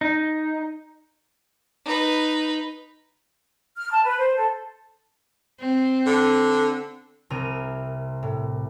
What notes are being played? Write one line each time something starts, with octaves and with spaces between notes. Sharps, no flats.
D#4
D#4 B4
F6
A5
B4
C5
A4
C4
D3
C2 C3 A#4 F6 D#7
A2